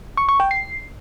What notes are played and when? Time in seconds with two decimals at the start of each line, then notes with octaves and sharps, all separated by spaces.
0.17 C#6
0.29 C#6
0.40 G5
0.51 C7